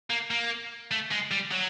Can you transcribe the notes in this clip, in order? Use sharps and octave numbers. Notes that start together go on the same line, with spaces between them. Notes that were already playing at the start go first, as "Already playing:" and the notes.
A#3
A#3
A3
G#3
G3
F#3